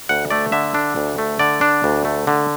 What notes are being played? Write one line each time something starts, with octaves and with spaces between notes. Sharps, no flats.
D2 F#5
A3 D5
D3 E5
D4
D2
A3
D3 D5
D4
D2
A3
D3